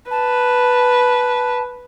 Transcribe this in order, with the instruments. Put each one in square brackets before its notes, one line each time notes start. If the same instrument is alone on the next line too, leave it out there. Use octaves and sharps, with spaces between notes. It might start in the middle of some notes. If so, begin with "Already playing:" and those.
[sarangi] B4 [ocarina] A5